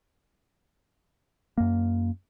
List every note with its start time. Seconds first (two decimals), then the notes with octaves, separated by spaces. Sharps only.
1.58 F#2 A#3